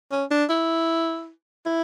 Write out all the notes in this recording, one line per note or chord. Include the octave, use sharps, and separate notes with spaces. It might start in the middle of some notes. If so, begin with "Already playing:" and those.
C#4
D4
E4
E4